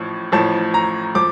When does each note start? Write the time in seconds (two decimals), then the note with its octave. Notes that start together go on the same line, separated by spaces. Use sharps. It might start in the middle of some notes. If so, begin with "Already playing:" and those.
Already playing: A1 A2 F3
0.32 A1 A2 F3 A5
0.74 A#5
1.15 F3 D6